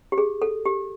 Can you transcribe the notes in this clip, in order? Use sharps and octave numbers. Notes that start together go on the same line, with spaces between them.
G4
G#4
A4
G4